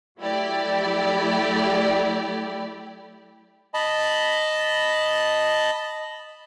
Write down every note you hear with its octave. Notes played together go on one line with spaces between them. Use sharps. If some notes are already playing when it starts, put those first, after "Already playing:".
F#3 A3 E4 G4 D5
D#5 A5 B5